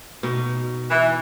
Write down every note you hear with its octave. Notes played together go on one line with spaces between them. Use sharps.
B2 D#4
E3